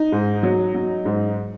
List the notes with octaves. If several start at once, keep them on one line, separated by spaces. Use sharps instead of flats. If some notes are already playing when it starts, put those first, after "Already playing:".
Already playing: D#4
G#2
F#3
F#3
G#2